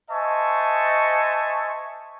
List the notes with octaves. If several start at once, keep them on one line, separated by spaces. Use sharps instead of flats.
C5 D#5 E5 G#5 A5 C#6